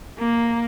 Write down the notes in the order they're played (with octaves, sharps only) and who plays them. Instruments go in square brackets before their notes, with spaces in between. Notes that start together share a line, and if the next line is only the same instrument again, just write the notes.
[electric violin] A#3